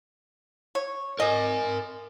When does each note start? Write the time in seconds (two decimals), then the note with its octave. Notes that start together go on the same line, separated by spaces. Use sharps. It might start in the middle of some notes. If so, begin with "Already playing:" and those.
0.75 C#5
1.20 A#4 D#5 G#5